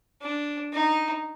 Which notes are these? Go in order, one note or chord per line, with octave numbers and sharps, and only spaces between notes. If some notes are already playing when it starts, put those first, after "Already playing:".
D4
D#4